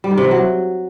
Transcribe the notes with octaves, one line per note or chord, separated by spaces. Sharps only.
G3
D#3
C3
E3
F#3